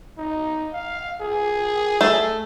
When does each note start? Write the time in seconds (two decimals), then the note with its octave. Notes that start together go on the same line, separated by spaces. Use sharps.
0.18 D#4
0.73 F5
1.21 G#4
2.01 A3